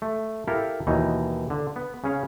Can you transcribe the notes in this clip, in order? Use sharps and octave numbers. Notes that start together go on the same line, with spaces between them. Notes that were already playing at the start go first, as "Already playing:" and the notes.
A3
E4 G4 A4 A#4 F5
D#2 B2 E3 D#4
D3
B3
C#3 C#4 F5